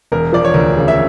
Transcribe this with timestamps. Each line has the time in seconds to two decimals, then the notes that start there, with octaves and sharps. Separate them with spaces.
0.12 E1 A#4
0.32 F3 D5
0.45 C#5
0.54 D2 A#4
0.76 C#3
0.88 E5